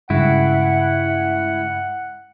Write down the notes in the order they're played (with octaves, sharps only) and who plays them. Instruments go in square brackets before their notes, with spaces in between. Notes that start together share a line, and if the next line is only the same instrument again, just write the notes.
[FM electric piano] G2 C#3 G#3 [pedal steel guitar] E4 [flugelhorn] F#5